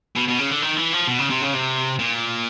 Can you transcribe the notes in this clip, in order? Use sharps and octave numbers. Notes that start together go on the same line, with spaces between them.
B2
B2
C#3
D3
D#3
E3
F3
B2
C#3
C3
C#3
C3
A#2